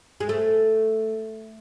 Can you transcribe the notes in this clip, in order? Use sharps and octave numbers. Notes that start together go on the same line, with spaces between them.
G#3
A3